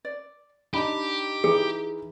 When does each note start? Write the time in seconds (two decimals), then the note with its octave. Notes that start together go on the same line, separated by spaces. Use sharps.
0.05 D5
0.74 D4 D#4 G4 B5
1.44 E3 D#4 G#4